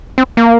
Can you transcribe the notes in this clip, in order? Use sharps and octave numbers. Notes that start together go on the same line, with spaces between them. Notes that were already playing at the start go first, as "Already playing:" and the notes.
C4
A#3